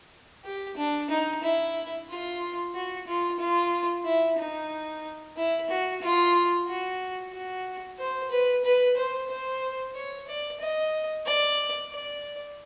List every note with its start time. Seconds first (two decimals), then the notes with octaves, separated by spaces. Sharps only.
0.44 G4
0.77 D4
1.10 D#4
1.43 E4
2.09 F4
2.74 F#4
3.07 F4
3.39 F4
4.05 E4
4.38 D#4
5.36 E4
5.70 F#4
6.02 F4
6.67 F#4
7.32 F#4
7.99 C5
8.31 B4
8.64 B4
8.97 C5
9.30 C5
9.95 C#5
10.28 D5
10.60 D#5
11.26 D5
11.92 D5